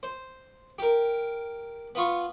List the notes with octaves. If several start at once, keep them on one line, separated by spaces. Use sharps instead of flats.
C5
G4 A#4
B3 F4 C#6